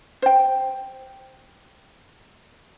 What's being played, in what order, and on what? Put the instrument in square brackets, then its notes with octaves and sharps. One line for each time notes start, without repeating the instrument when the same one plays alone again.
[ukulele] C5 G5